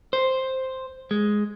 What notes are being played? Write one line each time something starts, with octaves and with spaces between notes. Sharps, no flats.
C5
G#3